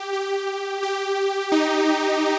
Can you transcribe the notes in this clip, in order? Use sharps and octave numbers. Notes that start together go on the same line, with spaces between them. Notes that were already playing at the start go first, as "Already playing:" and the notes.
Already playing: G4
G4
G4
D#4